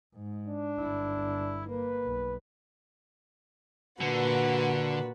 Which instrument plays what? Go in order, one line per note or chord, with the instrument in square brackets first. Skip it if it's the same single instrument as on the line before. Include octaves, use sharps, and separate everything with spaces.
[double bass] G#2
[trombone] D4
[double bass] G1 E4
[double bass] A#3 [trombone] B4
[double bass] B1
[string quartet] A#2 F#4 B4 [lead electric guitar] D3